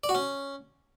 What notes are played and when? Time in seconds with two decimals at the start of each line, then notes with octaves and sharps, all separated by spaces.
0.04 D5
0.09 F#4
0.15 C#4